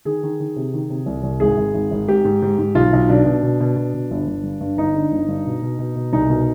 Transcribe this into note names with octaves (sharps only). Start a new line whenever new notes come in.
D#3 G#4
D#3
D#3
C3
D#3
C3
C2
C2
G#1 G#4
G#1
G#1
G#1
G#2 G4
G#2
G#2
G#2
B1 F4
B1
B2 D4
B2
B2
B2
B2
B2
G1
G1
G2
G2
G1 D#4
D3
G1
G2
B2
B2
B2
B2
C2 D#4
B2